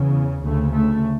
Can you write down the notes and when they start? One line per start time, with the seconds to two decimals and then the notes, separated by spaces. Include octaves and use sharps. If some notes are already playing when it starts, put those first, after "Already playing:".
Already playing: E2 C#3
0.45 D2 C#3 A3
0.75 A3